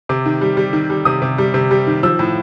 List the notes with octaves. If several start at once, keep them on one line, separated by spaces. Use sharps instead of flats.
C3 D6
D#3
G3
G3
D#3
G3
C3 D#6
C3
G3
C3
G3
D#3
F3 E6
A2